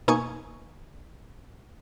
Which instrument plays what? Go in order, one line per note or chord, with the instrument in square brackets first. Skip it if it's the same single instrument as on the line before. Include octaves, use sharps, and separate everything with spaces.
[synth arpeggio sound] B2 A#3 D#4 G#5 C#6 G#6